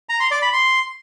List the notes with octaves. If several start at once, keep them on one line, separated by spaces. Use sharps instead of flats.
A#5
C6
D5
B5
C6